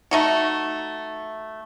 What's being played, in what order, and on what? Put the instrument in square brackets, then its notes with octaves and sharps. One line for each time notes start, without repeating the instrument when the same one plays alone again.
[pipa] A3 D#4 F#4